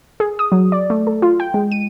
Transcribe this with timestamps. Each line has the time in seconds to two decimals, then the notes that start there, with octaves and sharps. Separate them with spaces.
0.20 G#4
0.39 D#6
0.52 F#3
0.72 D5
0.90 A3
1.07 A4
1.22 F4
1.40 G5
1.54 G#3
1.72 D#7